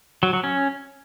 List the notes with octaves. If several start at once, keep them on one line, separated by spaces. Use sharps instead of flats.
F#3
F#3
C#4